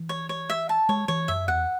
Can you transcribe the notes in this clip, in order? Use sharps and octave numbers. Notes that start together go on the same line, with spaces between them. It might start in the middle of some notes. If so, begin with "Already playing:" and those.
Already playing: E3
C#5
C#5
E5
A5
G#3 C#5
E3 C#5
F#2 E5
E2 F#5